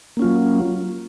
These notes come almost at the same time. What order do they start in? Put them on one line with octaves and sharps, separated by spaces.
A#3 C#4 F4 F#3